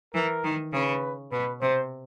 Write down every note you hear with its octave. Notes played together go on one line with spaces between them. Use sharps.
E3 A#4
D#3
C#3 B4
B2 B4
C3 C5